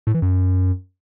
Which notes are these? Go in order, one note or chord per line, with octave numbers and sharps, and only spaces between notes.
A2
E3
F#2